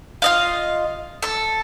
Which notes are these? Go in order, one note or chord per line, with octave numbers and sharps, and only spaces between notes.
F4 D#5 F5
A4 E6